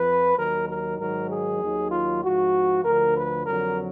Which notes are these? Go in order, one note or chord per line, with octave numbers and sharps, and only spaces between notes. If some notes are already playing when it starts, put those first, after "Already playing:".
Already playing: F2 F3 B4
D#2 D#3 F#3 A#4
A#4
G#2 D#3 F#3 A#4
G#4
D#2 D#3 F#3
F4
G#2 F3 F#4
D2 D3 F3 A#4
B4
F2 D3 F#3 A#4